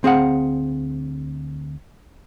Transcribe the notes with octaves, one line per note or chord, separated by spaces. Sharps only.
D2 C4 G#4 F5 F#5